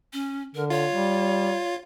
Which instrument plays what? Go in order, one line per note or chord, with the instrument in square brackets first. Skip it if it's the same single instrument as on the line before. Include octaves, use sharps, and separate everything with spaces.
[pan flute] C#4
[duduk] D3 [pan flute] A#4
[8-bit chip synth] F4 [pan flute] C#5
[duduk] G3